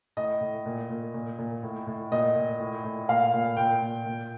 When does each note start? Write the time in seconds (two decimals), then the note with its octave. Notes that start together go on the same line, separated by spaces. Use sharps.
0.17 A2 D#5
0.41 A2
0.66 A#2
0.89 A#2
1.14 A#2
1.39 A#2
1.63 A2
1.87 A2
2.11 A#2 D#5
2.36 A#2
2.60 A2
2.84 A2
3.09 A#2 F5
3.33 A#2
3.57 A#2 G5
3.82 A#2
4.06 A#2